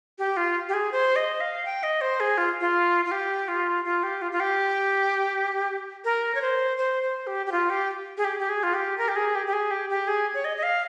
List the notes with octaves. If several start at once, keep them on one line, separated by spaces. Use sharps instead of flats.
G4
F4
G4
G#4
C5
D#5
F5
G5
D#5
C5
G#4
F4
F4
F4
G4
F4
F4
G4
F4
F4
G4
A#4
C#5
C5
C5
C5
G4
G4
F4
G4
G#4
G4
G4
G#4
F4
G4
A#4
G4
G#4
G4
G4
G#4
G4
G4
G#4
C#5
D#5
D#5
F5